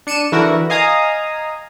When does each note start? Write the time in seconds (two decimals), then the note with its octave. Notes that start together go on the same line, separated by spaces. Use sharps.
0.07 D4 C#7 D#7 E7
0.32 D3 E3 E4 F#4 A#4
0.70 D#5 F5 G#5 A#5 D#6